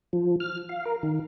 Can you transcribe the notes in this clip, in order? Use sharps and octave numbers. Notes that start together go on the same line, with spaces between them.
F3
F6
F5
A#4
D#3